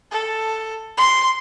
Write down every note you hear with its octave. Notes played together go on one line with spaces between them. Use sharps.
A4
C6